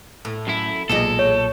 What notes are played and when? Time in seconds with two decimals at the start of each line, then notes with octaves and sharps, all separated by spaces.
0.25 A2
0.47 F#2 E4
0.89 B1 E2 A#2 G#3 A4 D#5
1.19 C#5